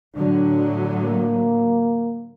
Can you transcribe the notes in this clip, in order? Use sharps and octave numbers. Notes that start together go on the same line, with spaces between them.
A2 D3 F#3 D4
A#3